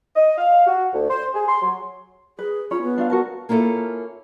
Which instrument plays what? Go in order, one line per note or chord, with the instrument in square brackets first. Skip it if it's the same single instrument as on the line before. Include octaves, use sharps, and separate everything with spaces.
[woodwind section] D#5
F5
F#4
D2
C5
G#4
C6
F#3
[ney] G#4 [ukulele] B4
[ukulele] C#4 C#5 B5 [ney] F4
[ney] B3
[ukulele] D4 F4 F5
F#4 A#4 A5
[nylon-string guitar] A#3 C#4 E4 F4 A4